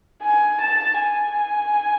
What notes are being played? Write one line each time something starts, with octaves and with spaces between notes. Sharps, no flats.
G#5
A5
G#5